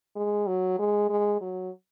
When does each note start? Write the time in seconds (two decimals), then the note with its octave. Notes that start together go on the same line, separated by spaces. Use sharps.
0.16 G#3
0.47 F#3
0.79 G#3
1.10 G#3
1.41 F#3